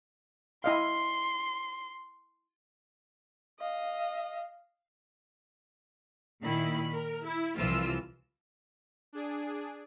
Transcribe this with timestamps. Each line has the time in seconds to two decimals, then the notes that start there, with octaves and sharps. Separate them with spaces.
0.64 E4 D#5 F5 C6
3.60 D#5 F5
6.42 A#2 D#3 E4 B5
6.92 A#4
7.25 E4
7.57 C2 E3 F3 F4 E6
9.13 D4 G#4